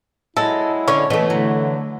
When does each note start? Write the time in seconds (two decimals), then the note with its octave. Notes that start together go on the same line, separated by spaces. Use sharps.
0.37 F#3 G#3 E4 A4
0.88 D3 C#4 D4 C#5
1.10 B2 E3 A3
1.30 D3 F#3